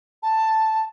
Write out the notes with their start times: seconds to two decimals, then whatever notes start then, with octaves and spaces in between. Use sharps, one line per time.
0.23 A5